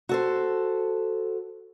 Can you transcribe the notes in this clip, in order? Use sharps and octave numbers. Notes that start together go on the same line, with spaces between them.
F#4 A4 C5